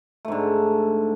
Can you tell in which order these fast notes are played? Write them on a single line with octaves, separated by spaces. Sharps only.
A3 G#2 D3